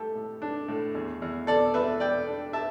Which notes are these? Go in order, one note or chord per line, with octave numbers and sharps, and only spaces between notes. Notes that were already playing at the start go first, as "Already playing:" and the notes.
Already playing: A2 A3 G4 A4
A2
D4
A2
E2
E2
B2 A4 D5
E2 B4 E5
B2 D5 G5
D4
E5 A5